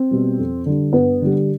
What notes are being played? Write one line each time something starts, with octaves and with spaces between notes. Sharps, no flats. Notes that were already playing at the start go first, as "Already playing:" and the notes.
Already playing: C4
B2 G3
F2
D3 G3
G2 B3
D3 G3